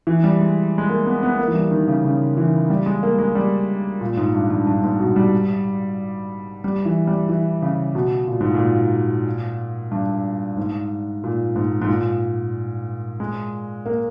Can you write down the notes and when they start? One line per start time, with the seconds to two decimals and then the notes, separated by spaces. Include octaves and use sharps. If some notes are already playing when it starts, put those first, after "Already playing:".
0.07 E3
0.24 G3
0.40 G#3
0.78 G#3
0.89 A#3
1.06 B3
1.23 B3
1.39 A#3
1.48 E3
1.55 G3
1.71 D#3
1.88 C#3
2.04 C#3
2.37 E3
2.70 G3
2.86 G#3
3.03 A#3
3.19 G#3
3.35 G3
4.01 A#2
4.17 G#2
4.34 G2
4.50 G2
4.67 G2
4.83 G#2
4.99 B2
5.16 G3
6.64 G3
6.86 E3
7.07 G3
7.29 E3
7.62 C#3
7.95 B2
8.28 A#2
8.41 G#2
8.54 A#2
9.91 G2
10.57 G#2
11.24 A#2
11.56 G#2
11.82 G#2
11.89 A#2
13.20 G#3
13.86 A#3